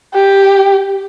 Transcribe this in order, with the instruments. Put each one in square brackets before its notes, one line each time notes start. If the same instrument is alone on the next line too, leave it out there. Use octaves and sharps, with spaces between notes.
[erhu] G4